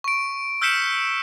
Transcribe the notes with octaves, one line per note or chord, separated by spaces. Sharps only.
C#6 D7
E6 F6 G6 B6 C#7 E7